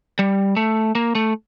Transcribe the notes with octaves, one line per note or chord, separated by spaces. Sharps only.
G3
A3
A#3
A3